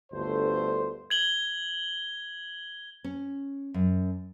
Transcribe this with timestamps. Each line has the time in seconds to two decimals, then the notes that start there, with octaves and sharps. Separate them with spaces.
0.12 G1 D2 A3 C5
1.10 G#6 F#7 G7
3.04 C#4
3.74 F#2